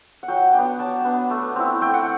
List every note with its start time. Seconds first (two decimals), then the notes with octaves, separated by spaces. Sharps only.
0.23 F#5
0.28 F#3 G5
0.53 B3 D4 G5
0.79 F#3 A5
1.05 B3 D4
1.31 A3
1.56 C4 E4
1.81 A3 G5
1.94 F#5